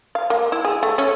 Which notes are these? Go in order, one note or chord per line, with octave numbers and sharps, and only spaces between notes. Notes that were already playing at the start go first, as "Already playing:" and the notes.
F5
A#3
E4
G#4
A3
C#4